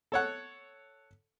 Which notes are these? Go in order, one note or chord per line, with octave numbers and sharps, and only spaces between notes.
A4 C#5 F#5